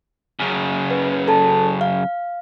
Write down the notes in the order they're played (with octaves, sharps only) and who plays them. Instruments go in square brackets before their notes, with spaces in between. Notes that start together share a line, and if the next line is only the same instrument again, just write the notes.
[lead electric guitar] F#2 C#3
[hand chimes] B4
A4 A5
F5